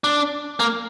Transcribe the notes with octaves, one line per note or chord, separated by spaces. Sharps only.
D4
A#3